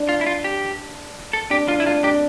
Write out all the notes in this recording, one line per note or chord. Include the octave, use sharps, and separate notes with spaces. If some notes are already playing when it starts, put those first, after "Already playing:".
Already playing: D4
F4
E4
F4
G4
A4
D4 G4
D4 F4
E4
D4 F4
D4 G4